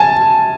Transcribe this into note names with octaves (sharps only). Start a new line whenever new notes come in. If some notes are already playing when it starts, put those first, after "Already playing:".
Already playing: G#5 A5